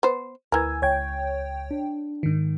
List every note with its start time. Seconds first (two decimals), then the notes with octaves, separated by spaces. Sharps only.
0.03 B3 C5
0.52 D2 E3 A#4 G#5 E6 G#6
0.82 C#2 C#5 G5 G#6
1.71 D4
2.23 G#2 D#3